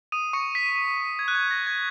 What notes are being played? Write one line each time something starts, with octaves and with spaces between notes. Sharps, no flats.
D#6 D#7
C#6 C#7
B6
G#6
F#6
G#6
A#6
G#6